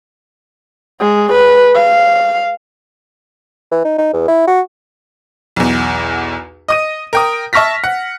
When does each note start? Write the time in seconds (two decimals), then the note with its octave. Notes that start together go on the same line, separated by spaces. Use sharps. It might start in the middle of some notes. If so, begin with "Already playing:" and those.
1.00 G#3
1.32 B4
1.75 F5
3.71 E3
3.85 D#4
3.98 D#4
4.13 E2
4.28 E4
4.47 F#4
5.56 B1 E2
6.68 D#5 D#6 D#7
7.13 A#4 G5 D#6
7.53 E5 A5 C#6 F6 A#6 B6
7.84 F#5